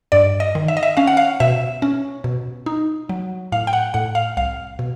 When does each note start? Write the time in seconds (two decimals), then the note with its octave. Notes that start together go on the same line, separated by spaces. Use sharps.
0.12 G2 D5
0.40 D#5
0.55 D#3
0.68 E5
0.77 D#5
0.83 E5
0.97 C#4 F5
1.07 F#5
1.17 F5
1.40 B2 E5
1.82 C#4
2.24 B2
2.66 D#4
3.09 F#3
3.52 A2 F5
3.67 G5
3.73 F#5
3.94 A2 F#5
4.15 F5
4.37 C2 F5
4.79 B2